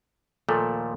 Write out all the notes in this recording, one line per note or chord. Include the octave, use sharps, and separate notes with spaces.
D#2 A#2 F3 A3 A4 A#4